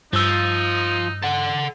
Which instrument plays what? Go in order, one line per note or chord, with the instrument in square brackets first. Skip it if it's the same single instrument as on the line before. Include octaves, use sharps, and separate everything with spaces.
[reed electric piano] G2 E6 [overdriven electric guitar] F3 [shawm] D#4
[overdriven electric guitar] A4 F#5